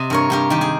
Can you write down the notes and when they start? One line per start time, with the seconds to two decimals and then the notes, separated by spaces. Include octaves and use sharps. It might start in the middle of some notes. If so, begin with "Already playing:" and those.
Already playing: C3 D#5
0.10 G2 A#4 C#5
0.30 G2 G4 A#4
0.50 D#3 G4
0.61 G#4